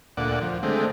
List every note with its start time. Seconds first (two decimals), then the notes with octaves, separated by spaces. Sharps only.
0.17 D2 A#2 D5 F#5
0.41 F3
0.63 D3 G#3 A3 C4